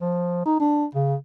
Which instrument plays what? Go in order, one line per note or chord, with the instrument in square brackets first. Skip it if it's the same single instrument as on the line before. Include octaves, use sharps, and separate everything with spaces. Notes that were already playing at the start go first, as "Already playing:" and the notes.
[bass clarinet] F3
D#4
D4
C#3